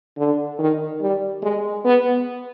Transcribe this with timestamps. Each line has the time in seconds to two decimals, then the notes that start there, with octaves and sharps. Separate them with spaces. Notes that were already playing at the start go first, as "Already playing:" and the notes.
0.17 D3
0.58 D#3
1.01 G3
1.42 G#3
1.85 B3